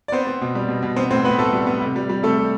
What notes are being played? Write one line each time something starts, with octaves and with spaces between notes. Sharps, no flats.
D5
B3 C4 C5
B3
B2
G3
B2
B2
B3 C4 C5
A2 C4 C5
A2 B3 B4
A2 A3 A4
G3
B3
C3
G3
G3
C3 A3 A4
G3